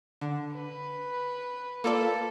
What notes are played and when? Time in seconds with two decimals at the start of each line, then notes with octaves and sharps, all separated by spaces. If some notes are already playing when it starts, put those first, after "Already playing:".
0.21 D3
0.55 B4
1.84 A#3 F4 A4 D5